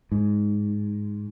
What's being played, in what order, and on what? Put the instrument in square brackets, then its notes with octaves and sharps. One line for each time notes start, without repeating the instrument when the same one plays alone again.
[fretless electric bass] G#2